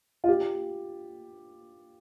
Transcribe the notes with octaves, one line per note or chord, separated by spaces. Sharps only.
F4
G4